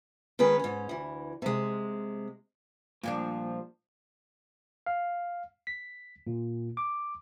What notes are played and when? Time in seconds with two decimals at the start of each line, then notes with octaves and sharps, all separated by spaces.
0.39 D#3 G#3 C#4 B4
0.60 G#2 C#4
0.89 D2 E3
1.42 C3 G#3
3.04 A#2 F3 G3 D4
4.86 F5
5.67 B6
6.27 A#2
6.77 D6